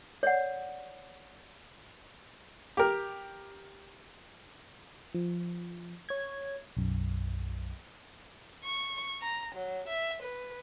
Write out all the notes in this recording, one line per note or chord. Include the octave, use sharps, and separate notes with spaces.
C#5 D5 F#5
G4 A#4
F3
C#5 G#6
B1 F#2
C#6
A#5
F#3
E5
B4